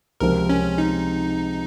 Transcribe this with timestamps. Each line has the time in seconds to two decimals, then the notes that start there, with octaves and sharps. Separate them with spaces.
0.20 C#2 C3 F3 C4 A#4
0.49 C#4
0.78 D#4